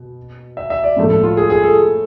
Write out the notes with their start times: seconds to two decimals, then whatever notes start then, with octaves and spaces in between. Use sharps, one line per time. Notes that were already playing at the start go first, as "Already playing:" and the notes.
Already playing: B2
0.57 E5
0.70 E5
0.84 D5
0.96 A2 F3 A3
1.10 A4
1.23 F4
1.37 G#4
1.50 G#4
1.63 A4